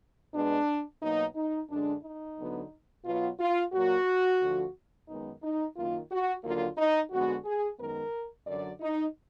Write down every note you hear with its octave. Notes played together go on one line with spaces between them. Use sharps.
B2 G#3 B3 D4
B2 F#3 A#3 D#4
D#4
F#2 D3 G#3 D4
D#4
D2 D3 F#3 B3
B2 F#3 B3 F4
F4
A#2 F#3 A#3 F#4
D2 D3 F3
F#2 D#3 G#3 B3 D#4
D#4
F#2 D#3 A#3 F4
F#4
D#2 D3 F#3 A#3 F4
D#4
F2 D3 G#3 B3 F#4
G#4
F#2 D#3 G#3 B3 A#4
F#2 D3 F#3 D5
D#4